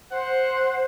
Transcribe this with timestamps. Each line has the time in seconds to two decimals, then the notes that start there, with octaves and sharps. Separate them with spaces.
0.11 C5 F#5